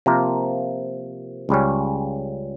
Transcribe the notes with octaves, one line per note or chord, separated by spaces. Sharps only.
C3 F3 A#3 F4 A#4
C#2 C#3 G3 C#4